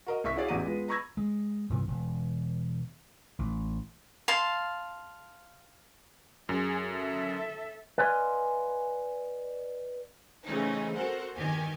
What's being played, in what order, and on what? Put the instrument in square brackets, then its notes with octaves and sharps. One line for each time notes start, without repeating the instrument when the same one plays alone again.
[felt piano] F#4 A#4 D#5
C2 E5 C#6 B6
E4 F#4 G#4 C#5 D5 F5
A1 E2 F#4 G4 A#5 D#7
G#3 B3 F4
A#5 B5 C#6 E6 G#6 A#6
[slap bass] G#3
G2 C3 E3 F3
E1
A1
[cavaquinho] F5 A5 C6
[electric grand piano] F#2 [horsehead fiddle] G#4
[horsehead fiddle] A4 E5
[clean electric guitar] B4 D5 D#5 F5 G#5 C6
[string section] C#3 E3 A3 C4 C#4 D#4
C4 F#4 A4 A#4 C5 F#5
E2 G2 D#3 G4 G#5